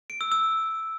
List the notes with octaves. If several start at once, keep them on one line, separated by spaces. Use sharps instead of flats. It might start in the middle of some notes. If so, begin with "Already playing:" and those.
D7
E6
E6